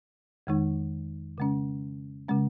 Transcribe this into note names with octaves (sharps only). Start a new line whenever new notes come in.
F2 D#3 G#3 D#4
C#3 G#3 C#4
C#3 G#3 C#4